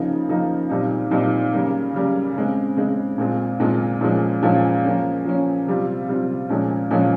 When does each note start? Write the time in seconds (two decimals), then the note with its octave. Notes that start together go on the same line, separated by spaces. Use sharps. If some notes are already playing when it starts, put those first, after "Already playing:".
Already playing: C#3 F3 A#3 D#4
0.28 C#3 F3 A#3 D#4
0.69 A#2 G3 C4 D#4
1.11 A#2 G3 C4 D#4
1.53 C#3 G3 A#3
1.94 C#3 G3 A#3
2.36 C#3 G#3 C4
2.77 C#3 G#3 C4
3.18 A#2 G#3 C4 F4
3.59 A#2 G#3 C4 F4
4.01 A#2 F3 G#3 C#4
4.42 A#2 F3 G#3 C#4
4.83 F3 A#3 C#4
5.25 F3 A#3 C#4
5.67 C3 G3 C4 F4
6.08 C3 G3 C4 F4
6.49 A#2 F3 G#3 C#4
6.91 A#2 F3 G#3 C#4